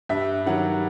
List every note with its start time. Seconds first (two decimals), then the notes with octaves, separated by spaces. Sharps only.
0.09 G2 E5
0.46 D#3 F#3 F#5